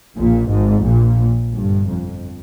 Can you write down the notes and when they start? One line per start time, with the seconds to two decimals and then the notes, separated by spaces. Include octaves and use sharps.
0.15 A#1 A#2
0.49 G#1 G#2
0.84 A#1 A#2
1.52 G1 G2
1.87 F2